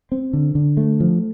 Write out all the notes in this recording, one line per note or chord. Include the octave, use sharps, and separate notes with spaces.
C4
D3
D3
A3
F3